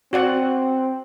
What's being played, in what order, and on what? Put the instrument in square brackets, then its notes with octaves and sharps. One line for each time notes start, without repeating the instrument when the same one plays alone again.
[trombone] C4 [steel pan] F#4 D5 F#5